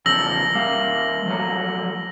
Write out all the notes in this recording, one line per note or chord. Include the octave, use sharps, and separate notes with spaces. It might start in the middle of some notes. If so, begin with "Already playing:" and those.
E2 C#3 F3 E6 A#6 F#7
G3 A#3 F5
F3 F#3 A3